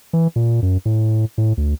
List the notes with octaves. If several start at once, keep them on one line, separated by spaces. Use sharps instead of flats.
E3
A#2
F#2
A2
A2
D2